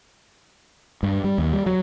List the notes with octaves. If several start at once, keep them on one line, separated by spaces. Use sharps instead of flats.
G2
G3
D#2
G3
F#3